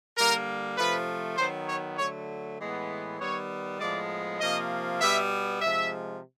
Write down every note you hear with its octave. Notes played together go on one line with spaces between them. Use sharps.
D3 G3 A#3 A#4
C3 F3 A3 B4
D#3 F#3 B3 C5
C#5
D3 F#3 A3 C#5
A2 E3 G#3 B3
D#3 G3 B3 C#5
A2 F3 G#3 B3 D5
C3 F3 A#3 D#5
B2 G3 B3 E5
C3 F3 G#3 E5